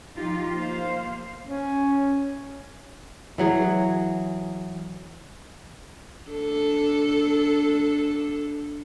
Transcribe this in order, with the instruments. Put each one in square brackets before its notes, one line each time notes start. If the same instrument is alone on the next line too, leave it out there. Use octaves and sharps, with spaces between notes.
[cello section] F3 D#4 F4 G4
A#3 C5 F5
[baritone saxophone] C#4
[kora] E3 F#3 G#4
[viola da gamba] D4 A4